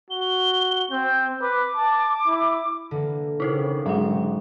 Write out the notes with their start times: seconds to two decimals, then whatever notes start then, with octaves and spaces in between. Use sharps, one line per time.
0.10 F#4 G7
0.91 C4 G6
1.41 B4 D6
1.76 A5
2.27 E4
2.91 D3 E3 A#3
3.40 C#3 D#4 E4 A#4
3.86 G#2 F#3 C4 F#4 F#5